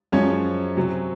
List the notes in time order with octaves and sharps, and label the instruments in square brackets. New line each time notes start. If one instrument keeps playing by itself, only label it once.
[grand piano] F#2 F3 G#3 C#4 C#5
C3 F#3